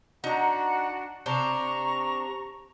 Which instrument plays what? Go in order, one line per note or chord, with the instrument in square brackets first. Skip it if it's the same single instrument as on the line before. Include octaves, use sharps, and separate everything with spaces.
[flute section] D4 F#4 F#5 [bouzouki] D#4 A#5
[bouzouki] C3 D4 C5 [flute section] A#5 C#6